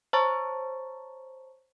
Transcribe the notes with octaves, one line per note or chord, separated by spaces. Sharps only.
C5 C#5 A5 A#5 C#6 A6